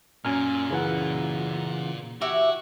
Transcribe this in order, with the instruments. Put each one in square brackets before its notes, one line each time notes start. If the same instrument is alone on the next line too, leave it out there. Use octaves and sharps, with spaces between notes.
[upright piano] F#2 [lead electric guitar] A#2 [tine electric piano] G#5 F6
[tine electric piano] C#3 E3 F#5
[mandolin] E4 G4 [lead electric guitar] F#4